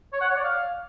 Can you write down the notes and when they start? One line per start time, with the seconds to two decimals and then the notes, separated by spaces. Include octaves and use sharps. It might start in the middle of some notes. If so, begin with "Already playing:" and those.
0.13 C#5
0.21 F#5
0.28 C#5
0.36 D5
0.44 F5